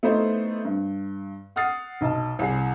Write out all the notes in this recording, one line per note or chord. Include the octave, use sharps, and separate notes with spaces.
A3 B3 D#4 E4 C5 E5
G2
F#5 D#6 F6 A6 C7
B1 D#5 A5
C2 G#4 C7